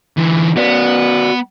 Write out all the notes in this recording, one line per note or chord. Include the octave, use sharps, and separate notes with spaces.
D3 E3
B3 F#4 B4 D5